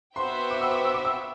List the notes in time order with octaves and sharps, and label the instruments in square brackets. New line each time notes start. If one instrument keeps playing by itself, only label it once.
[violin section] B3 F#4 C5 E5 G5 [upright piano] C6
[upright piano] D6
E6
D6
E6
D6
E6